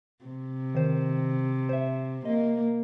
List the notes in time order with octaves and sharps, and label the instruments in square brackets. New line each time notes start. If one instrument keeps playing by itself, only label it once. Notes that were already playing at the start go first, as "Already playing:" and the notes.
[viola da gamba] C3
[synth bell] D#3 C5
C5 E5
[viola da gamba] A#3 [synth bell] D#5